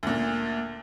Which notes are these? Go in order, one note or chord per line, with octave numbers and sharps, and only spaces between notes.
D2 A#2